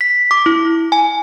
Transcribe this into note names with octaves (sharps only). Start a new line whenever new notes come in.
B6
D6
E4
G#5